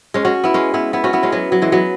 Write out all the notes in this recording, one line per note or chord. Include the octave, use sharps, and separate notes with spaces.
G#3 C#4
C#4 F#4
B3 E4
G#3 C#4
B3 E4
B3 E4
C#4 F#4
B3 E4
G#3 C#4
F#3 B3
F#3
E3 G#3
F#3 B3